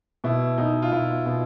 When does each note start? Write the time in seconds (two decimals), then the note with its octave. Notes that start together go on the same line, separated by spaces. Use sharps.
0.24 B2 E4
0.58 B2 D#4
0.82 F4
0.92 B2 E4
1.26 B2